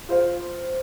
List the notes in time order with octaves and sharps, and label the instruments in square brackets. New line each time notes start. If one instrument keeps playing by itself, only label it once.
[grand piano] F4 C5 F5